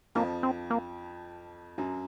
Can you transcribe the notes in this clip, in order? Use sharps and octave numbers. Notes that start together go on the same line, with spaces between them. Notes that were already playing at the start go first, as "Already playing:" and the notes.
F2 F3 A#3
C4
A#3
F#2 F#3